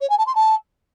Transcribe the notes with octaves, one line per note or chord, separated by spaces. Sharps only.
C#5
G#5
A5
C6
A5